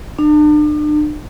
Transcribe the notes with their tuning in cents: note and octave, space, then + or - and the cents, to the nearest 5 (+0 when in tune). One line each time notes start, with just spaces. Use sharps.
D4 +40